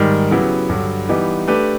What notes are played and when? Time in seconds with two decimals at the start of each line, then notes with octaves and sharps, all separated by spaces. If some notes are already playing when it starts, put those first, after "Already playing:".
Already playing: G#2 D#3 G3
0.31 C#3 F#3 B3 E4 G4
0.69 G2 D3 F#3
1.09 E3 G3 B3 D#4 G4
1.47 A3 D4 G4 B4